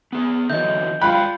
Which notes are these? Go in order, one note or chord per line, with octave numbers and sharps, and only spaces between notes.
B3 G#4
D3 E3 F#3 D#5 E5 G6
F4 D5 F5 G5 B5 F#6